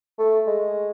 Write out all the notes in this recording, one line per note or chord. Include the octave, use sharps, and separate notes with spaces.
A3
G#3